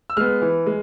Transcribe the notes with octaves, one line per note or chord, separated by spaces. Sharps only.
E6
G#3 B3 F6
E3
G#3